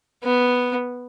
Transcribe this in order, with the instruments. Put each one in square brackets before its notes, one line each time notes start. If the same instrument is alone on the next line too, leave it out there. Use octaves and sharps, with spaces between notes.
[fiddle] B3